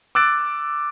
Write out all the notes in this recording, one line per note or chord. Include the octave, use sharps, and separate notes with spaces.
D6 E6 F#6 A6 D7